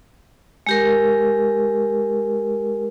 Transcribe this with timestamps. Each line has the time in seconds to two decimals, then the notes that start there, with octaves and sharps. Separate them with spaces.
0.67 G#3 G4 A#4